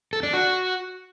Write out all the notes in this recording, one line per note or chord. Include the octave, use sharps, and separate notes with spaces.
A4
D4
F#4